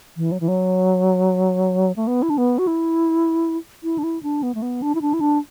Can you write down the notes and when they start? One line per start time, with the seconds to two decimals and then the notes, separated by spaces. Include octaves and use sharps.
0.17 E3
0.32 F#3
0.40 E3
0.48 F#3
1.96 A3
2.07 B3
2.23 E4
2.30 D4
2.38 B3
2.59 F#4
2.67 E4
3.83 E4
3.98 D4
4.03 E4
4.23 D4
4.43 B3
4.55 A3
4.62 B3
4.82 D4
4.95 E4
5.02 D4
5.14 E4
5.21 D4